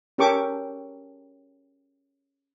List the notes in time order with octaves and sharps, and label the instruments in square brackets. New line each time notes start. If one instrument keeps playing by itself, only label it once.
[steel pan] C#4 G4 A4 A#4 C#6 D6